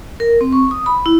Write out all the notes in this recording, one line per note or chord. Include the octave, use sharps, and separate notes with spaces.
A#4
C4
C#6
D#6
B5
E4